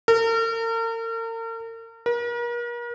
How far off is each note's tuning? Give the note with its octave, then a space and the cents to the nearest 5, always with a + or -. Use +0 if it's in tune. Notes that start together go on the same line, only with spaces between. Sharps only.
A#4 -40
A#4 +40